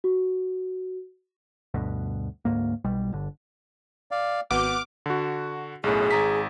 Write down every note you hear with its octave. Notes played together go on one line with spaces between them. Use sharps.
F#4
D2 G2 B2
D2 G#2 A#3
B1 B2 G3
G1 D3
D5 F5
G#1 B3 F#4 D6 F6 G6
D3 F#4
B1 F#2 A2 G#4
G#1 A#5 B6